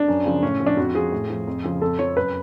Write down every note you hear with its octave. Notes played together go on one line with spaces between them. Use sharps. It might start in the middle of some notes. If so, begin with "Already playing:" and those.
Already playing: D4
F#2
C#3 F3
A2 C#4
F3
D4
F2 F#4
F3 G#4
A2
F3
F2
C#3 F3
F2 A4
F3 C#5
F#2 B4